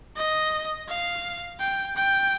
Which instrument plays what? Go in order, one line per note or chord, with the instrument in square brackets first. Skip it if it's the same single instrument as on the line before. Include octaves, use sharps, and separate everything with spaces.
[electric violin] D#5
F5
G5
G5